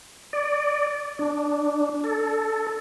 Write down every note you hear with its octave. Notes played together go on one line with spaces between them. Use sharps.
D5
D4
A4